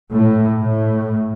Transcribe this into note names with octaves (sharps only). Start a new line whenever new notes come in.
A2
A2